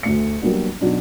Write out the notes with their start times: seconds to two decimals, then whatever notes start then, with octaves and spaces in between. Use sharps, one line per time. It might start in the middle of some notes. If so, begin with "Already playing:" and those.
0.03 D2 A3 C#7
0.42 F#3 G3 A#3 B3 D4 F#4
0.81 B2 F#3 D4 D#4